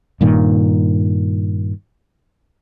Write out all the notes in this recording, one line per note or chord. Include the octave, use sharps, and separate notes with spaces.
G2 A#2 D#3